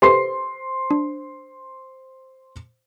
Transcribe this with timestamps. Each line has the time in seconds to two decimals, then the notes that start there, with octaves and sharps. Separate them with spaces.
0.02 G4 A4 B4 C5 C6 C7
0.91 D4